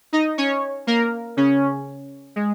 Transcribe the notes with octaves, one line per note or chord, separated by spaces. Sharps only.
D#4 D#5
C#4 C#5
A#3 A#4
C#3 C#4
G#3